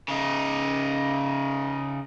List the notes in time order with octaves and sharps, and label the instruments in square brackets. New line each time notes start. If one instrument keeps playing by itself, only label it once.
[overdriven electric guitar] C#3 D#4